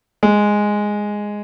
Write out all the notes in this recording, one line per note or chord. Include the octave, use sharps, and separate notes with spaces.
G#3